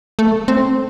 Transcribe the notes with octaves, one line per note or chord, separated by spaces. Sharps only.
A3
C4